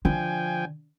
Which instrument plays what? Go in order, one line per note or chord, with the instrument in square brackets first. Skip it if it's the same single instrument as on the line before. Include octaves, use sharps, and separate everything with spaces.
[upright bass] D3 [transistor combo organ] F3 G5 G#5